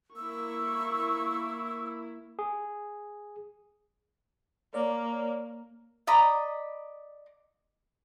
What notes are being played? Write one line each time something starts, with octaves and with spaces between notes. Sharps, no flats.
A#3 E4 C#6 E6
G#4
A#3 C#5 D5
D5 D#5 A#5 B5